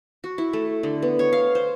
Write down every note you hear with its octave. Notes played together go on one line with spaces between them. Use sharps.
F#4
E4
A3
D3
B3
C#5
F5
C5